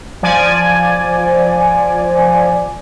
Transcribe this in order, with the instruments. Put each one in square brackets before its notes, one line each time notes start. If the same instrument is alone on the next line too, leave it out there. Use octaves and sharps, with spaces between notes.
[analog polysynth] F3 D5 G#5